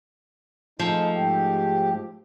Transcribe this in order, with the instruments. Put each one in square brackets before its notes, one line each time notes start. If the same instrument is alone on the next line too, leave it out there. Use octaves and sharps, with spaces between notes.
[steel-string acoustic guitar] F3 A3 [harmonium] G#3 D#4
[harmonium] G#2 G4